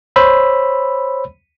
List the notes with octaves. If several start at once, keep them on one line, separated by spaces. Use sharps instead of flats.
C5 C#5 B5 E6